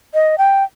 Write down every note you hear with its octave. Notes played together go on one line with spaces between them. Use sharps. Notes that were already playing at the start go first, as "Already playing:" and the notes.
D#5
G5